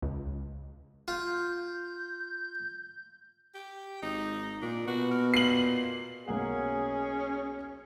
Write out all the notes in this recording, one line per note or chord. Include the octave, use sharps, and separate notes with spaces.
C#2
F4 G6
G4
G#1 D#4
A#2 D4
B2 F#4
A#4
A#2 C7 F#7
B1 A#3 C#4 G#4 F#5